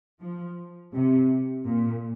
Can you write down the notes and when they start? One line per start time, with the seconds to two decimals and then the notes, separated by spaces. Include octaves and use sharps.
0.20 F3
0.92 C3
1.66 A#2